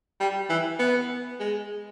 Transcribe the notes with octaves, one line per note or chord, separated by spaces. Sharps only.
G3
E3
B3
G#3